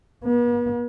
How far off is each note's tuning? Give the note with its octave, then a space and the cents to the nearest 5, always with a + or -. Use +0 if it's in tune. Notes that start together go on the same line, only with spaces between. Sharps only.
B3 -45